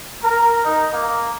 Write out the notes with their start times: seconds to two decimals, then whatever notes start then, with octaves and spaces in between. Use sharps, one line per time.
0.23 A#4
0.65 D#4
0.93 A#3